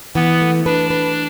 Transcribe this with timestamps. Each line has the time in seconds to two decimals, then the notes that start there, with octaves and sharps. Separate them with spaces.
0.15 E3 B3
0.41 A3
0.66 D4 B4
0.90 B4